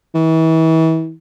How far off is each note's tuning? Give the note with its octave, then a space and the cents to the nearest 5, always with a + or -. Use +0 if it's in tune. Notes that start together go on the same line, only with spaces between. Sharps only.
E3 -35